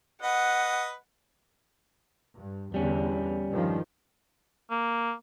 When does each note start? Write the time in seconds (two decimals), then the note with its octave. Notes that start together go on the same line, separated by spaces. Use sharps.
0.22 B4 D#5 F#5
2.37 G2
2.74 E2 D3 G3 C#4
3.52 G2 D#3 F3
4.71 A#3